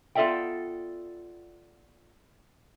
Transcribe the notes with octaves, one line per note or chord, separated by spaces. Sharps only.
B3 F4 A4 D5 E5 G5